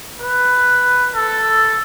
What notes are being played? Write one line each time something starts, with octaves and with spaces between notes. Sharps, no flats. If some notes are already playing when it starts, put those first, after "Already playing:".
B4
A4